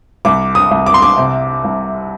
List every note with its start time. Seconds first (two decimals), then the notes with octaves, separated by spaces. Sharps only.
0.25 C2 D6
0.55 D#6
0.71 C2
0.86 D6
0.94 C6
1.02 D6
1.18 C3
1.64 C2